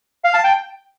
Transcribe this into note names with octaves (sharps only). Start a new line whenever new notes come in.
F5
A5
G5